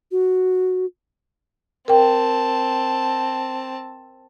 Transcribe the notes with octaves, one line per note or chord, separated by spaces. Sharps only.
F#4
C4 A#4 G5 A5